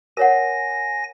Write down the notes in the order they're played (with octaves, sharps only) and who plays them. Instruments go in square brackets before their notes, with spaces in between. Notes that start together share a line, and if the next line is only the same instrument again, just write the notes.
[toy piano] A#4 C#5 F#5 [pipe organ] G#5 A#6